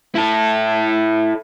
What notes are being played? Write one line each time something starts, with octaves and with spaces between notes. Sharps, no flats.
E4 A4